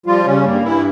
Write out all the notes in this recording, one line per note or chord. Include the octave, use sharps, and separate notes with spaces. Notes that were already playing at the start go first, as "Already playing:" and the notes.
F3 G3 F4
C#3 G3 C#4
G2 A#3
G2 E3 E4